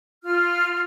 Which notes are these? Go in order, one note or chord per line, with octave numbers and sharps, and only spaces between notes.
F4 F6